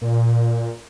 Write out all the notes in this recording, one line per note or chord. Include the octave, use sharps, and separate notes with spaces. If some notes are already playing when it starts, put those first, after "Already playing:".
A#2